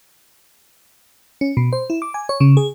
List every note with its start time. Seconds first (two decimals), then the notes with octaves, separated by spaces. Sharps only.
1.41 C#4
1.57 B2
1.73 C5
1.90 E4
2.02 D6
2.14 G#5
2.29 C#5
2.40 C#3
2.57 G#4